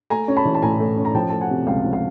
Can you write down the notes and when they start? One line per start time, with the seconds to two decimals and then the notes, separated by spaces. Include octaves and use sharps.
0.10 A3 G#5 A#5
0.28 C#4
0.37 A5 B5
0.45 E3
0.55 A5
0.62 A2 G#5 A#5
0.80 A3
0.97 C#4
1.05 A#5
1.15 F3 G5 A5
1.29 A3 A5
1.41 F#5 G#5
1.50 C3
1.67 C#2 F5 G5
1.84 F3
1.93 F5